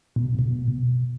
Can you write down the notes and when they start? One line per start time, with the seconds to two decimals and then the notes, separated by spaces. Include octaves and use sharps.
0.16 B2
0.39 B2